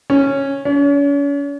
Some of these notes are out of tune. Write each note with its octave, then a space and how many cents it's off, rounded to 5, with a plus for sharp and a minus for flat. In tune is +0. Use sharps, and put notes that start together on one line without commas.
C#4 -10
C#4 +40